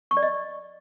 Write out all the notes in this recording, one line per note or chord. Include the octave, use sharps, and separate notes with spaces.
C#6
D5
D#5